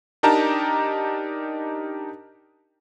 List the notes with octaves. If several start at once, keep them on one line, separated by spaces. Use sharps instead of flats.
D4 D#4 G4 A#4 A5 A#5